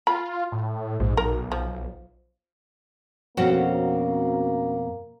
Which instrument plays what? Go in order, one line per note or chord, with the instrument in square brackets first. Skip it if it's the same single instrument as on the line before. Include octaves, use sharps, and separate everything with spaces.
[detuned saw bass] F4 [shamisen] B5
[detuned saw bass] A2
[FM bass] A#1 [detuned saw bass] G#2
[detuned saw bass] B1 [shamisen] A#4
[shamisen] F3
[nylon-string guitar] F2 B2 [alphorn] A#3 [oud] C4 C#4 F#4